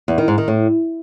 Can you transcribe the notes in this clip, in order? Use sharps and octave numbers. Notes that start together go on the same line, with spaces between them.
E2
D#3
G#2
D#3
A2